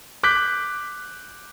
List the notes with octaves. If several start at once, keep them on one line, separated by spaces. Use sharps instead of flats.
D6 F#6 G6 B6